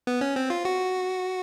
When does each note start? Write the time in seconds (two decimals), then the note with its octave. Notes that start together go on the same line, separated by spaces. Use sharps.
0.07 B3
0.21 C#4
0.36 C4
0.50 F4
0.65 F#4